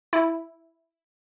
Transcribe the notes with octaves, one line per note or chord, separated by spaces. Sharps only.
E4